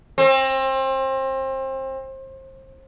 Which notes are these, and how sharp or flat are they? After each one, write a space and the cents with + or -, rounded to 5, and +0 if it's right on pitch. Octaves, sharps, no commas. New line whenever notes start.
C4 +30